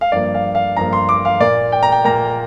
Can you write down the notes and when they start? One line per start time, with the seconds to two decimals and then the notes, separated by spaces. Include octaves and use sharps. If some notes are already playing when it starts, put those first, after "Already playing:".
0.01 F5
0.12 G2 F3 A#3 D5
0.34 F5
0.55 F5
0.77 G2 F3 A#3 A#5
0.93 C6
1.09 D6
1.25 F5
1.40 A#2 A#3 D5
1.72 G5
1.83 A#5
1.92 G5
2.04 A#2 A#3 A#5